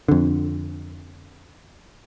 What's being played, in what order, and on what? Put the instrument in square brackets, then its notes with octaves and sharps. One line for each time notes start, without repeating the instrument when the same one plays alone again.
[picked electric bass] F2 D3